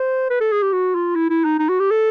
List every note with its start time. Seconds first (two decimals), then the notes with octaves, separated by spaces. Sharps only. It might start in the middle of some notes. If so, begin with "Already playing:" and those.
Already playing: C5
0.30 B4
0.41 A4
0.52 G#4
0.63 G4
0.73 F#4
0.95 F4
1.16 E4
1.30 E4
1.45 D#4
1.59 D#4
1.69 F#4
1.80 G4
1.91 A4